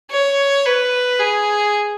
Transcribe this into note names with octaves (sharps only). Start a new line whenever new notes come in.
C#5
B4
G#4